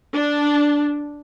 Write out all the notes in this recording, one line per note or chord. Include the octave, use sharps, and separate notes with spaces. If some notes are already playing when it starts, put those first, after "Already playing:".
D4